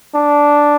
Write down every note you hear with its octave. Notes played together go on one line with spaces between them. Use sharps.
D4